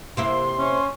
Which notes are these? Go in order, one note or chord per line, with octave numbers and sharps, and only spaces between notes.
C3 A#3 E4 C6
C#4